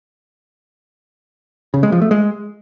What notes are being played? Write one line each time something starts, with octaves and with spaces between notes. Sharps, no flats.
C#3
G#3
F3
A3
G#3